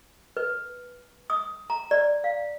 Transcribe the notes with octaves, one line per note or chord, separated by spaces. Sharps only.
B4
D#6
A#5
D5
F5